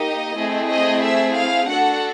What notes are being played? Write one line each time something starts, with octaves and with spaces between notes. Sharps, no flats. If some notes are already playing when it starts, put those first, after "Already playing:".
Already playing: A#3 D#4 G4 D#5
A3 C4 E4 G#4
D#5
E5
F5
D4 F#4 A4 F#5